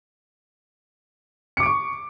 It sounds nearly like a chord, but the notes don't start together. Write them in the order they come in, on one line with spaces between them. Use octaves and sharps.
C#7 D6 D7 C#6